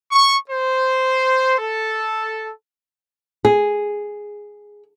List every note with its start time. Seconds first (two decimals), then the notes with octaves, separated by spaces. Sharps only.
0.12 C#6
0.50 C5
1.59 A4
3.45 G#4